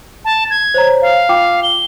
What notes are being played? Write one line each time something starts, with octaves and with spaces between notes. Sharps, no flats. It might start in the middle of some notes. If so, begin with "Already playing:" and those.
A5
G#6
C5 C#5 A#5
F5
F4 G5 D6
G7